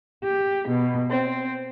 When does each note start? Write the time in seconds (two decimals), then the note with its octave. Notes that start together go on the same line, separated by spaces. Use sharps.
0.22 G4
0.67 B2
1.10 C4